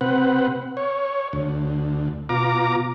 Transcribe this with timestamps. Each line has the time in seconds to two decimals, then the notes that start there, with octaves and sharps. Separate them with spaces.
0.01 C3 C4 B4 F#5
0.77 C#5
1.33 D2
2.29 B2 F4 A#5 D6